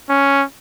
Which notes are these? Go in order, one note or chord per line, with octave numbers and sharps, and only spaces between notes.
C#4